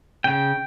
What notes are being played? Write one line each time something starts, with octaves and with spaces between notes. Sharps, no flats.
C#3 G5